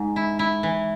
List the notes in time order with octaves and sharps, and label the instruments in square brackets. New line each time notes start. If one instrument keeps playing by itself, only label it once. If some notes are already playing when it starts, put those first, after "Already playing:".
Already playing: [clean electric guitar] G#2
[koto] E4
E4
E3